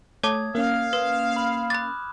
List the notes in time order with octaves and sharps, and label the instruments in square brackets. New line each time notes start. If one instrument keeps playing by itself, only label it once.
[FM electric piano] A3 [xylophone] C#5 A5 D6 [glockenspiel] D#6 G#6
[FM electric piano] A#3 C#4 [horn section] F5 [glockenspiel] F#6
[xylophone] B4 [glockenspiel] C6 D#6 E7
[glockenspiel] B5 F6
[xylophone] B5 A6 [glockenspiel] D6 F#6